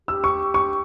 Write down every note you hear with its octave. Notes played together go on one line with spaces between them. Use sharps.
G4 E6
C#6
C#6